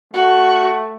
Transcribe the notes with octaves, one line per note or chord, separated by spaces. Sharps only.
A3 F#4